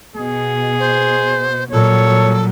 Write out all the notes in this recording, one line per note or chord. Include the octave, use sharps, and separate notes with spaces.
B2 G#4
C5
A#2 F#3 G3 A4 C#5